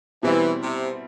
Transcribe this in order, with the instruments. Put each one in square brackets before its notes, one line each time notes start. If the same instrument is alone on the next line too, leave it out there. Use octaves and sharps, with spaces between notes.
[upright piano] B2 G3 C4 E4 [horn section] E3
[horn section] C3